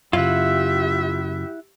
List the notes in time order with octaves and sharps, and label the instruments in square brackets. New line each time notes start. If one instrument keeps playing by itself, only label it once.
[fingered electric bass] F#2 C#3 [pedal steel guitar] E4 F#5 [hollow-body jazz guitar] F4 [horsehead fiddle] G4 E5